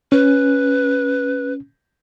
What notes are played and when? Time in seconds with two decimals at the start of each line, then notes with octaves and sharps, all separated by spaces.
0.12 C#4 B4